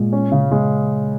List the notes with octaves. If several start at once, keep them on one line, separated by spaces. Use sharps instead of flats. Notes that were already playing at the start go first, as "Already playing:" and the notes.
Already playing: A#2 G#3
C#4
C#3
G#3